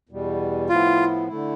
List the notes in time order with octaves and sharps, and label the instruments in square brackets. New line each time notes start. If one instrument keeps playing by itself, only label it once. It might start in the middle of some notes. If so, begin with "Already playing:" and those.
[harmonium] E2 B2 G3
[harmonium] A2 F3 B3 E4 [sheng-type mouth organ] F4
[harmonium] D3 A3 E4